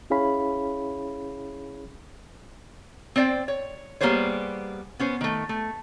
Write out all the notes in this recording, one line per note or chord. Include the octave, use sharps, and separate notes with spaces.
C#4 E4 G#4 C#5 F5 B5
C4 C5 D5 F#5 G5
C#5
G3 A#3 B3 G#4 C5 C#5
B3 C#4 C5
D#3 A3
A3